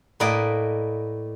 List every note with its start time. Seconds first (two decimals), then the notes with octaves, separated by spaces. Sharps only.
0.20 A2 A#3 B4 D5 D#5